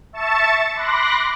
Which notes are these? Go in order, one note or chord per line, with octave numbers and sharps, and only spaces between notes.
E5 A5 C#6 A6 C#7 E7
B5 C6 D6 F#6 A#6